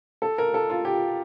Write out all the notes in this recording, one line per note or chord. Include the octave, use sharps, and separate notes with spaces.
A4
A#4
A4
F4
G4